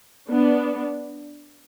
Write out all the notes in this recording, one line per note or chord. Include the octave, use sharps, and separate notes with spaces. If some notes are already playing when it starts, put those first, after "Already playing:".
B3 D4